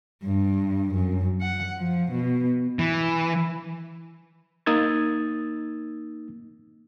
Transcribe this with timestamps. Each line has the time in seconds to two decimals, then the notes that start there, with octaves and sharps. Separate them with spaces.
0.24 G2
0.95 F#2
1.41 F#5
1.78 F3
2.12 B2
2.79 E3
4.66 A#3 D#4 D#6 E6 G#6 A6